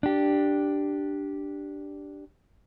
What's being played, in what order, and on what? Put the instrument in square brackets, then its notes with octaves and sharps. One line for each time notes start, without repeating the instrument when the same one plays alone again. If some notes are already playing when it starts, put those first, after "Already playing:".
[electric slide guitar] D4 G4